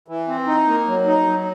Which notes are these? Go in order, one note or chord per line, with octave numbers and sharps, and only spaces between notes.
E3
C4
D#4
A#3
F#3
D#4
F#3